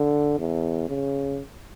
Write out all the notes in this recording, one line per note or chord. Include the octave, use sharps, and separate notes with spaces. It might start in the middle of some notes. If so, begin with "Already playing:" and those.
Already playing: D3
E2
C#3